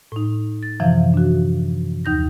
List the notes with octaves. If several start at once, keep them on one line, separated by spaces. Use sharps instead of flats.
A2 D#4
A6
F#2 C3 E3 F3 E5 F5
D4 F#4
D#2 D#4 G6 A#6